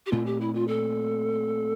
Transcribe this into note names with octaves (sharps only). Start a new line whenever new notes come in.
G4
A#2 A3 C4 F4
G4
E4
F4
A4